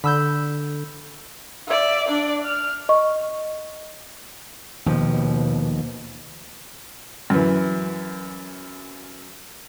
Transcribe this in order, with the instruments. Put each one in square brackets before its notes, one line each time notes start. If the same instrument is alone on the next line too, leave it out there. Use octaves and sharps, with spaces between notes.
[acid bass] D3 [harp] B5 E6 G6
[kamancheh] D5 E5
D4 D5
F6
[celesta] D#5 C#6
[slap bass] D#2 F3 [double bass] B2
[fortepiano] F#2 E3